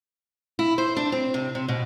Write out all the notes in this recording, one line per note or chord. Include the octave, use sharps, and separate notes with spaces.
E4
C5
D4
C4
C3
C3
B2